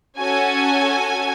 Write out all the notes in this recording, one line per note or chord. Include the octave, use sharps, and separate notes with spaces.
C#4 F#4 A4 G#5